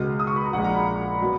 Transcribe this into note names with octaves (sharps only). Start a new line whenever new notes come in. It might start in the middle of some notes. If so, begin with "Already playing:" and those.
Already playing: C#2 B2 G#3 F6
D#6
C#6
B5
A#5
A#1 A#2 G#3 F#5
A#5
B5
B2 F#3 B3